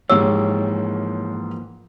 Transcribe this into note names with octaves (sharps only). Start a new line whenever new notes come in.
G#2 E3 F3 A#3 G4 C#5 E6